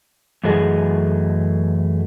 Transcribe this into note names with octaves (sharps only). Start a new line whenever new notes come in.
F#2 E3 A3 F#4 G#4 D#5